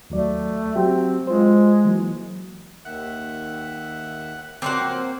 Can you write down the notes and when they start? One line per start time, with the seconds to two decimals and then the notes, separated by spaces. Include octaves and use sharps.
0.10 D#2 F#3 A3 D5
0.75 F#3 C4 F#4 G4
1.27 G#3 F4 C5
1.85 E3 F#3 A#3
2.85 D#2 D#3 E5 F#5
4.62 F3 F#3 A#3 C4 C5 C#5 F#5